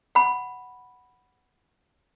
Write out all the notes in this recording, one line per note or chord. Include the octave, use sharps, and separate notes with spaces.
F#5 B5